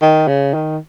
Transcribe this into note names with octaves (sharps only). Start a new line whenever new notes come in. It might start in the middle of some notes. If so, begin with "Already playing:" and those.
D#3
C#3
D#3